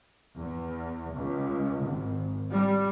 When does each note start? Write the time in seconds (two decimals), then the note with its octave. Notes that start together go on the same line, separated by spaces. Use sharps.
0.38 E2
1.16 C#2
1.84 G#1
2.51 G3